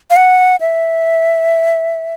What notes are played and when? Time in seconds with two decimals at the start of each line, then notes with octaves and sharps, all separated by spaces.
0.10 F5
0.16 F#5
0.61 E5